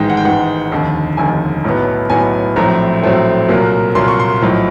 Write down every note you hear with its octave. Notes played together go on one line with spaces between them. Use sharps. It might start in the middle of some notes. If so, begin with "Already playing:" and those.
Already playing: A1 G#2 D#3 G#3 G5
F#5
G5
A1 G#2 D#3 G#3 F#5
F1 D#2 D3
F1 D#2 D3 G#5
B1 A2 F#3 B3
B1 A2 F#3 B3 G#5
A#1 A2 F#3 A3 C4 A#5
A#1 A2 F#3 A3 C4
C2 A#2 F#3 A#3
C2 A#2 F#3 A#3 C6
C#6
C6
B1 A2 F3